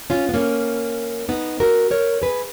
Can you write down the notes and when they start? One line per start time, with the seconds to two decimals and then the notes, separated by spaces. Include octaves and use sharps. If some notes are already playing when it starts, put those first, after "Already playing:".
0.10 C#4 F4
0.29 B3
0.34 A#3 C#4
1.29 B3 D#4
1.60 F#4 A#4
1.91 A#4 C#5
2.22 G#4 B4